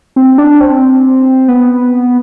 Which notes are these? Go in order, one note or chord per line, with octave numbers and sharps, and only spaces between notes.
C4
D4
C4
B3